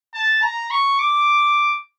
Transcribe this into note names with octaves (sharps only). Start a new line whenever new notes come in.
A5
A#5
C#6
D6